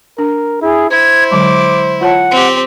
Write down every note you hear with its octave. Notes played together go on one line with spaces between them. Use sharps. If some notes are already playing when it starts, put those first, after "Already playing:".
D4 A#4
E4 G#4
E4 C5 G#6
D3 F#3 G#3 D6
F4 C#5 F#5 A5
C4 G4